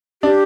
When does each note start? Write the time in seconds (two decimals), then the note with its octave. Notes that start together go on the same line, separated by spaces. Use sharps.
0.23 D4 G4